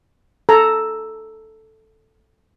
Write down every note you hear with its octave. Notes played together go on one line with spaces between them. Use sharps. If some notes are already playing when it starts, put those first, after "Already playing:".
A4 A#5